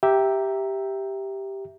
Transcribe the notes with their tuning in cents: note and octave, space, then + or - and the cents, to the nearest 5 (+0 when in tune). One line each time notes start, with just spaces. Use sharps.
G4 +0 E5 +0 A#5 +0